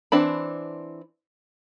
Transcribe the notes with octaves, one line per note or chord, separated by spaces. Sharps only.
E3 C4 D4 B5